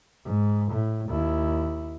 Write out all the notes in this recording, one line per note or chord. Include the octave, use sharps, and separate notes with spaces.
G#2
A2
D#2 E4